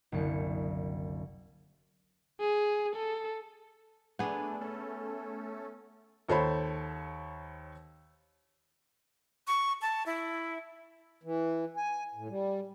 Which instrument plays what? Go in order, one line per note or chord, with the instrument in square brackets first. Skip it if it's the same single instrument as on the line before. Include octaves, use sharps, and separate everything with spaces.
[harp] F#1 C2 D3 C#7
[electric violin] G#4
A4
[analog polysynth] A3 D4 [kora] B3 G#4
[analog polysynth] A3 C#4 A4
[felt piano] D#2 A4 C5 C#5 B5
[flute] C#6
A5
E4
[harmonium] E3
G#5
A2
G3